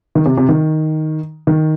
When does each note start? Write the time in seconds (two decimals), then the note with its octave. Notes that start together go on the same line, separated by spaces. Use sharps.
0.15 D#3
0.26 C3
0.38 C3
0.49 D#3
1.47 D#3